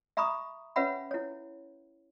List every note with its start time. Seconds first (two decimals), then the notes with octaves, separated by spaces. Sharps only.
0.17 E5 A#5 B5 C#6 D#6
0.76 C#4 B4 C#5 E5 F#5 B5
1.11 E4 C#5